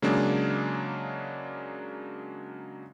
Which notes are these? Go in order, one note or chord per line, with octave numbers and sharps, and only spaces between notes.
C#3 F#3 G#3 A#3 D4